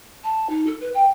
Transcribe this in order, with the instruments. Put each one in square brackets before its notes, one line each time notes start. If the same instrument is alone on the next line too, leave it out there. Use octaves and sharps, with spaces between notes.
[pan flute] A5
D#4
A4
B4
G5